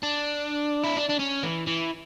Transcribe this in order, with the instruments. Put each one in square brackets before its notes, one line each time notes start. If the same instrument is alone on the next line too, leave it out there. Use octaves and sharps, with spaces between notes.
[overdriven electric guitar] D4
E4
D4
D4
C#4
E3
E3